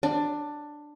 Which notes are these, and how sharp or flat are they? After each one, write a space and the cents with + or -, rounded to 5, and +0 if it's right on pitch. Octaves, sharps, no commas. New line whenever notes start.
D4 +10